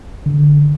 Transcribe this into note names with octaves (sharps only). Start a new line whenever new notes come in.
D3